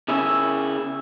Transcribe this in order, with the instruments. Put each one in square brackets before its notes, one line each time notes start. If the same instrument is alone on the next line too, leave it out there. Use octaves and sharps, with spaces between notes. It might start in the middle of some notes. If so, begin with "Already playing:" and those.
[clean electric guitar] C#3 C#4 E4